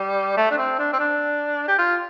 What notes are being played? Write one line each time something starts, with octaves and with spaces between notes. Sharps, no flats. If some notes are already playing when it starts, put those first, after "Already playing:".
Already playing: G3
A3
D4
C4
D4
C4
D4
G4
F4